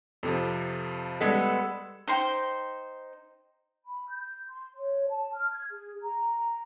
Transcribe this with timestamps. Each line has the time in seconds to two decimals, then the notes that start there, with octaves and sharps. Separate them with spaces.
0.23 F2 C3 F3 A4
1.21 G3 G#3 B3 A4 D#5 G#6 B6
1.49 E6
2.08 D#4 C5 G5
3.85 B5
4.09 G6
4.49 C6
4.76 C#5
5.09 A5
5.34 F6
5.51 G#6
5.70 G#4
6.02 A#5